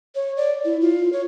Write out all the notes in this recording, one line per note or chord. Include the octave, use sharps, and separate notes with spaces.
C#5
D5
E4
F4
C#5